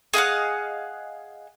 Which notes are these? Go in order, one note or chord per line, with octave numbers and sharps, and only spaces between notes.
G#4 D#5 F5 F#5